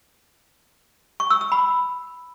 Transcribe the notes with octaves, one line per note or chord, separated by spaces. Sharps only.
C#6
E6
E6
B5